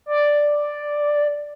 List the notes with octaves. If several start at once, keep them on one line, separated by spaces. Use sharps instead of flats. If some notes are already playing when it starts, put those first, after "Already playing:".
D5